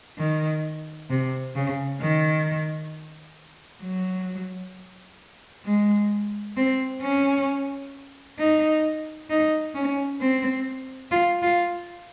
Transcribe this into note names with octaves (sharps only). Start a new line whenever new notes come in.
D#3
C3
C#3
D#3
F#3
G#3
C4
C#4
D#4
D#4
C#4
C4
F4
F4